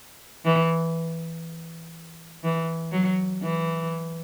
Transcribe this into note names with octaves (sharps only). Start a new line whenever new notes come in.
E3
E3
F#3
E3